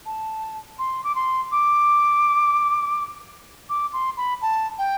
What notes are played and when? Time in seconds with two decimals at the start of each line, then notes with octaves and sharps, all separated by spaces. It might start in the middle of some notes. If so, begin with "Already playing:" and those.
0.06 A5
0.79 C6
1.04 D6
1.15 C6
1.52 D6
3.69 D6
3.93 C6
4.17 B5
4.42 A5
4.78 G5